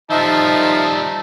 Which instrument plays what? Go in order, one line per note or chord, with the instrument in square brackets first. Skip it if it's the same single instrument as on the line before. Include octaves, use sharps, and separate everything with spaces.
[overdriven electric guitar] D#3 G3 [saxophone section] F3 E5 [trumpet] D#4 [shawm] A5